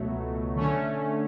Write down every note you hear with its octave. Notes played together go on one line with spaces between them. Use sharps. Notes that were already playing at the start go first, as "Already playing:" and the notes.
Already playing: C#2 B2 F#3 A3
D3 A3 C#4